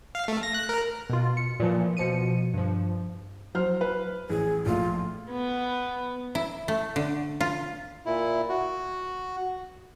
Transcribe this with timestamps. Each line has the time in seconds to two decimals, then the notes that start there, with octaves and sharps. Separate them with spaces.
0.15 F5
0.28 A3
0.43 A#6
0.54 F#6
0.69 A#4
1.10 B2 F4
1.37 C#7
1.60 A#2 E3 F3
1.97 B2 F3 C#7 D#7
2.54 G2 F3
3.54 F#3 C5 F6
3.81 B4
4.30 A1 G#4
4.66 A#1 A3 F4
5.31 B3
6.35 E4
6.68 A3
6.96 D3
7.41 F4
8.06 A#2 E4
8.49 F#4